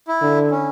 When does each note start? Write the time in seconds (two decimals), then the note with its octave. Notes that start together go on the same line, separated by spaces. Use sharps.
0.08 E4
0.22 D3
0.51 C#4